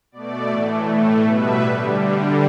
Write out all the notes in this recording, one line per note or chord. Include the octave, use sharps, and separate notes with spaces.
B2 A3 D5
A2 E3 A3
A2 A3
B2 G3 B4 E5
D3 G3